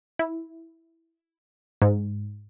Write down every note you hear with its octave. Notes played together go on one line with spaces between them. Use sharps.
E4
G#2